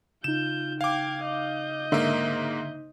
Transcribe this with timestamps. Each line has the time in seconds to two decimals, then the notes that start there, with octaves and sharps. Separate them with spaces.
0.24 C#3 D#4 F4 G6 E7
0.81 F5 G5 D6 G#6
1.25 D#5 G6
1.92 G#2 D3 A#3 E5